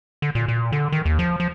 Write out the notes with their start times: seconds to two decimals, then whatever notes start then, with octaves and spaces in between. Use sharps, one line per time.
0.22 D3
0.35 A#2
0.48 A#2
0.72 D3
0.92 D#3
1.05 D#2
1.19 F3
1.40 F3